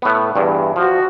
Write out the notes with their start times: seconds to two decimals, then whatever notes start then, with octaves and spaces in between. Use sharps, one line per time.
0.02 A2 B3
0.36 E2 G2
0.76 F3 F#4